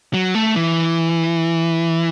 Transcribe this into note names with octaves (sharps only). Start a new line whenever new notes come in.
F#3
A3
E3